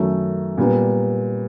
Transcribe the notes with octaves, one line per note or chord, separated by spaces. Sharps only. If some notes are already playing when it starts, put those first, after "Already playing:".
Already playing: F#2 D#3 F#3 A3
A#2 G3 B3